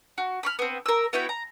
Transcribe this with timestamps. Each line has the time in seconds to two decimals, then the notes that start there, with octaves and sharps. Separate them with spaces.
0.18 F#4
0.43 B5 C#6 F6
0.59 B3 C4
0.86 A#4 E6
1.13 B3 E4 F#4 G5
1.29 A#5